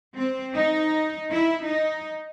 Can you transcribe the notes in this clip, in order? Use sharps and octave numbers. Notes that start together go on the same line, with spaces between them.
C4
D#4
E4
D#4